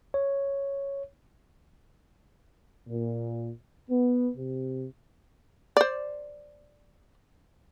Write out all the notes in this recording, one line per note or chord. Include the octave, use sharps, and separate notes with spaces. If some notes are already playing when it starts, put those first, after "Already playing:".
C#5
A#2
B3
C3
C5 D5